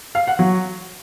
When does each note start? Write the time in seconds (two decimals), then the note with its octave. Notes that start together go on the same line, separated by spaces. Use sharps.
0.15 F5
0.27 F#5
0.39 F#3